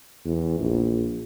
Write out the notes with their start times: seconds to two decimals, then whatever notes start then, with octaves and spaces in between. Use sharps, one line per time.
0.25 E2
0.59 A#1